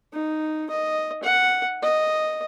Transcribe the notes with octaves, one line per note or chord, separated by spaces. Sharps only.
D#4
D#5
F#5
D#5